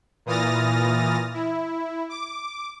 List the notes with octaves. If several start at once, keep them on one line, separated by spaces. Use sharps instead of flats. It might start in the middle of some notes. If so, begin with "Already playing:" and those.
A#2 E3 D#6 F6 A6 A#6
E4
D6